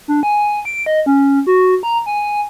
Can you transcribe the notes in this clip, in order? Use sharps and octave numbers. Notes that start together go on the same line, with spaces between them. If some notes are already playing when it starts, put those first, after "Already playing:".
D4
G#5
D7
D#5
C#4
F#4
A#5
G#5